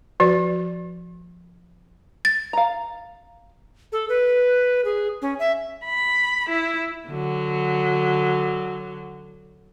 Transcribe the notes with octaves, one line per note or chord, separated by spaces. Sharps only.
F3 F#4 D5
A6
F5 A#5
A4
B4
G#4
C#4
E5
B5
E4
D3 F#3